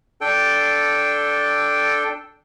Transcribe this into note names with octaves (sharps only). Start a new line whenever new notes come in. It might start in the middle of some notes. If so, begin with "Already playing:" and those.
D4 A4 G5